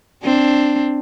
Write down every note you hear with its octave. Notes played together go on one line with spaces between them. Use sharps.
C4 D4